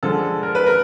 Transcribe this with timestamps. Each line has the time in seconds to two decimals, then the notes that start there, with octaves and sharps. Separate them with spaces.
0.03 D3 F3 G#3 A4
0.43 A#4
0.55 B4
0.66 A#4